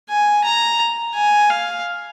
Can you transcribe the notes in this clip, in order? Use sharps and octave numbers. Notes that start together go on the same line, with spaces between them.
G#5
A#5
G#5
F5